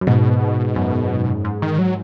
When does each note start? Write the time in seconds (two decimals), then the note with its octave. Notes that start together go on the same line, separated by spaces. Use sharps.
0.01 F#2
0.07 G#2 B2
0.76 F#2
1.45 G#2
1.62 D#3
1.79 F#3